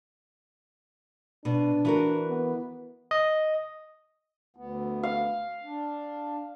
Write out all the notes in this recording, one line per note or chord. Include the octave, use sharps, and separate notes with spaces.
B2 D4
E3 F#4 A#4
B3
D#5
D2 B3
F5
D4